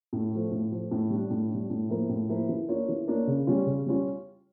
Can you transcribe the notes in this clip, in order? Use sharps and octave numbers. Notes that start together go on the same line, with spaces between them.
A2
F3 A3
A2
F3 A3
A2
G3 D4
A2
G3 D4
A2
F3 A#3 E4 A#4
A2
F3 A#3 E4 A#4
E3
A#3 D4 F4 C#5
E3
A#3 D4 F4 C#5
C#3
G3 C#4 F4
C#3
G3 C#4 F4